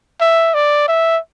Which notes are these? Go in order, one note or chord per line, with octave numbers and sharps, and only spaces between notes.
E5
D5
E5